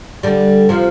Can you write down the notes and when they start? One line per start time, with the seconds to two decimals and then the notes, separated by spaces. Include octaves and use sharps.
0.23 D3 G3
0.69 C3 F3